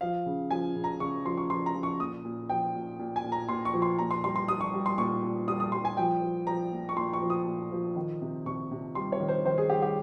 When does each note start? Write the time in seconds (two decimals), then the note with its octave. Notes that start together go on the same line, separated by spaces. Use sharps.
0.01 F3 F5
0.26 C#3
0.51 F3 G#5
0.76 C#3
0.84 A#5
1.00 C#3 C#6
1.25 F3 C6
1.38 C#6
1.50 F3 C6
1.66 A#5
1.75 F3
1.83 C#6
2.00 A#2 D#6
2.25 A#2
2.49 F3 G5
2.75 A#2
2.99 A#2
3.16 G#5
3.24 A#2
3.32 A#5
3.49 A#2 C6
3.65 C#6
3.74 F3
3.82 C6
3.99 A#2 A#5
4.11 C6
4.24 G3 C6
4.36 C6
4.48 G3 D#6
4.61 C#6
4.73 G3
4.86 C6
4.98 A#2 C#6
5.23 A#2
5.47 G3 D#6
5.60 D#6
5.72 G3 C6
5.85 G#5
5.97 F3 G5
6.22 F3
6.47 F3 A#5
6.72 A#2
6.89 C#6
6.96 A#2 C6
7.13 C#6
7.22 F3
7.30 D#6
7.46 A#2
7.72 F3
7.96 D#3
8.21 C3
8.46 C3 C#6
8.71 C3
8.95 G3 C6
9.12 C#5
9.20 D#3
9.28 C5
9.45 D#3 C5
9.58 G#4
9.70 G3 G4
9.82 G4